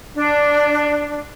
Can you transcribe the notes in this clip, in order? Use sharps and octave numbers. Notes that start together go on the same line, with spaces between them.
D4